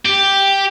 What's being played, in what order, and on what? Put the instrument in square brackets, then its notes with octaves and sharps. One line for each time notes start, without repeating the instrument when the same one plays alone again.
[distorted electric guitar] G4